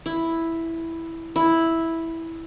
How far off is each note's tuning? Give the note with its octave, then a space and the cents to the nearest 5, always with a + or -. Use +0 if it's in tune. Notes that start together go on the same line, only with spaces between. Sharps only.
E4 +0
E4 -5